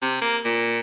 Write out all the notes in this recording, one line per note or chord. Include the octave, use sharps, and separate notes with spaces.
C3
A#3
A#2